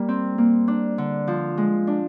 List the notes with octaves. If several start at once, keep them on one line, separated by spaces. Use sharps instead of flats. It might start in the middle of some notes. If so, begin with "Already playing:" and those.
Already playing: G3 A#3
C4
A#3
D4
D3
F3
G#3
D4